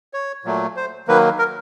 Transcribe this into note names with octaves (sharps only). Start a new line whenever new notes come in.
C#5
A#2 F#3 A3
C5
D#3 F#3 A#3 B4
A#4